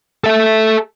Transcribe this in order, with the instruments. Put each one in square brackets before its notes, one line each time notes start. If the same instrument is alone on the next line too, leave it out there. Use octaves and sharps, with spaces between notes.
[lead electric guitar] A4 E5